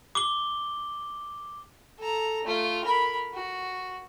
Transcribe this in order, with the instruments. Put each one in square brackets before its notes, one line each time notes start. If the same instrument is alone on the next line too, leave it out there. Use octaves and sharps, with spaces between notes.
[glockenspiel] D6 G7
[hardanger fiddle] A4 A#5
A3 F4
A#4 B5
F#4